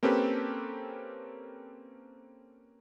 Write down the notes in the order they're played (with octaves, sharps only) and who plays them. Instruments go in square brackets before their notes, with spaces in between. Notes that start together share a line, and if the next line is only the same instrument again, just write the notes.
[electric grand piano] A#3 C4 C#4 G4 A4 B4